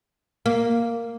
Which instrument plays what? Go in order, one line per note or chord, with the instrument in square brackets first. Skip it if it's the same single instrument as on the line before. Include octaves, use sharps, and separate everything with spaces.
[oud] A#3